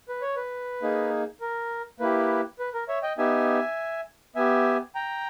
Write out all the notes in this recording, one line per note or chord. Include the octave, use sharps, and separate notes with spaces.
B4
C#5
B4
A#3 D#4 G#4
A#4
A#3 E4 G4 B4
B4
A#4
C#5 E5
D#5 G5
B3 D#4 G4 E5 G#5
B3 G4 E5 G#5
G5 A#5